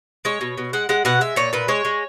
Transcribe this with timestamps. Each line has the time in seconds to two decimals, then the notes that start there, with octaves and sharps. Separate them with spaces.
0.25 G#3 C#5
0.41 B2
0.58 B2
0.73 G#3 F#5
0.89 G#3 F#5
1.05 B2 F#5
1.21 G#3 E5
1.36 A#2 C#5
1.53 A#2 B4
1.68 G#3 C#5
1.85 G#3